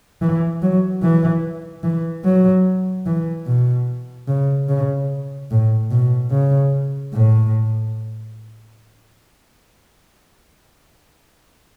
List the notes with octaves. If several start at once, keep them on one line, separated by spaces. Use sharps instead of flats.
E3
F#3
E3
E3
F#3
E3
B2
C#3
C#3
A2
B2
C#3
A2